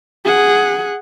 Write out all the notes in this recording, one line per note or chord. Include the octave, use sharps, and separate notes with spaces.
G#4 F#5